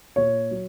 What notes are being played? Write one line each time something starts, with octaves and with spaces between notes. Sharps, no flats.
A#2 C#5
F#3